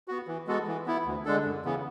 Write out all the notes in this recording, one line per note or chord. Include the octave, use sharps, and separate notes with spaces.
B3 F#4
E3
G#3 B3 F#4 A4
E3
B3 E4
D2
D3 G#3 D4 A4
F#2
C#3 E3 B3